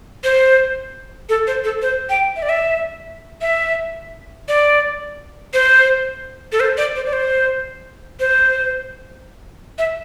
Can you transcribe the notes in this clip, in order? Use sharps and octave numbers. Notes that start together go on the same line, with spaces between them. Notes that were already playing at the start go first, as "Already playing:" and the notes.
C5
A4
C5
A4
C5
G5
E5
D5
E5
E5
D5
C5
A4
C5
D5
C5
D5
C5
C5
E5